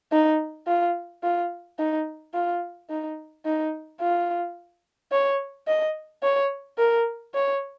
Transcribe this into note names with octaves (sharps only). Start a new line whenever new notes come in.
D#4
F4
F4
D#4
F4
D#4
D#4
F4
C#5
D#5
C#5
A#4
C#5